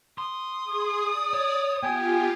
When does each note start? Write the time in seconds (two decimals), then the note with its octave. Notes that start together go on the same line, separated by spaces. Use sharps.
0.18 C6 D#6
0.64 G#4
1.04 D5
1.34 C#5
1.83 B3 F4 G4 G5 G#5